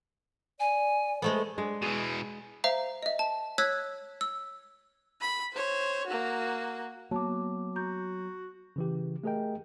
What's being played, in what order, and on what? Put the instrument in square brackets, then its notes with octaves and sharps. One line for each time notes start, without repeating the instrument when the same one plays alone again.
[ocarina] D5 [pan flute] G#5
[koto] G#3 A3 B3 [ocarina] C5
[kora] G#3 D4
[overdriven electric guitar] B2 E3 [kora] G#4
[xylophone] C5 E5 F5 A#5
D#5 E5
A5
C#5 E6 F#6 G#6 B6
E6
[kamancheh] B5
C5 C#5
A#3 F#4
[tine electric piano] F#3 [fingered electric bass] A#3 B3 [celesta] A5 D6
[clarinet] F#4 [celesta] A#5 G6
[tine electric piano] C#3 E3 G4
A3 G4 G#4 A#4 D#5 G5